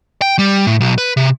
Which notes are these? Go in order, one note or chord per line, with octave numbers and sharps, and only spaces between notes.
G5
G3
A2
B1
B4
C3